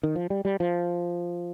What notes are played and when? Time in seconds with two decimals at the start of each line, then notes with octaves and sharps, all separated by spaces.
0.03 D#3
0.16 F3
0.30 G3
0.45 G3
0.60 F3